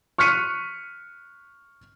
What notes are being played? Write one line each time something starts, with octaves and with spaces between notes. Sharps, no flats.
C#6 F6 F#6 B6 C#7 D#7